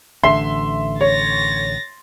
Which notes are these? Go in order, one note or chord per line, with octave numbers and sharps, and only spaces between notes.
A1 D3 E5 C6
C#5 A6 A#6